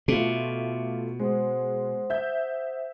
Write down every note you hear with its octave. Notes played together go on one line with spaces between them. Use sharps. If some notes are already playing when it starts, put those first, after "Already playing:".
B2 A3 F4 E5 D6
G#3 C5 F#5 D#6
E5 G6